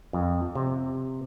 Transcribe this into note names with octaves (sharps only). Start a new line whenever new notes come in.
F2
C3